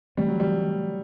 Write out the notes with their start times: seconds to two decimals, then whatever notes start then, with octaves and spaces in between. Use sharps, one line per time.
0.17 E3 G3 A3 C4
0.28 F#3
0.40 G3